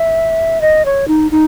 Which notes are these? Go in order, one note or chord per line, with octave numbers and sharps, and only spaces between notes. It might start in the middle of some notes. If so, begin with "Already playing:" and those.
Already playing: E5
D#5
C#5
D#4
D#4